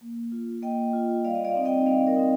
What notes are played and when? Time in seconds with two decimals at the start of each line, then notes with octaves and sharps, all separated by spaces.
0.01 A#3
0.32 F4
0.62 A#3 D#5 G5
0.93 F4
1.24 G3 D5 F5
1.35 D#5
1.45 D5 F5
1.55 C4 D#4
1.65 D#5 G5
1.86 G3 D5 F5
2.07 A#4 D5
2.16 C4 D#4